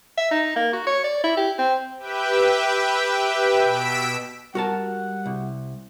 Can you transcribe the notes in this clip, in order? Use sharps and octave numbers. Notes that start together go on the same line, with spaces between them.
E5
D#4
A#3
F#4
C#5
D5
E4
G4
C4
G4 B4 E5 G5
B2 E6 B6 D7
G3 F#4 A#4 F#5 A5
C2